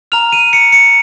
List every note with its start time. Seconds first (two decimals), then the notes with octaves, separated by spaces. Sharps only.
0.12 A#5 F6 F7
0.32 D#7
0.53 C#7
0.72 C#7